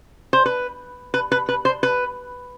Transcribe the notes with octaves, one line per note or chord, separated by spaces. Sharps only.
C5
B4
B4
B4
B4
C5
B4